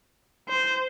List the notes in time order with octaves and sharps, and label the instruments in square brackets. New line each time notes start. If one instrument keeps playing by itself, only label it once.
[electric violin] C5